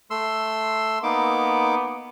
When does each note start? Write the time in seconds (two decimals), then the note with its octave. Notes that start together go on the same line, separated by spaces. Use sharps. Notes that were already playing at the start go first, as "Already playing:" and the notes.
0.11 A3 C6 E6
1.03 A#3 B3 D#4 D6